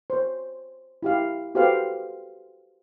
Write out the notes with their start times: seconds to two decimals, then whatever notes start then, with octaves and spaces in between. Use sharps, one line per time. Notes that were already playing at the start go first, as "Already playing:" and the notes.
0.10 C5 C#5
1.03 E4 G4 F5
1.55 F#4 G4 A4 B4 C5 F5